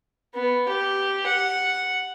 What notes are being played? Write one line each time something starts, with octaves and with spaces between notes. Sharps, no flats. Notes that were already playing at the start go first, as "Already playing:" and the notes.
B3
G4
F#5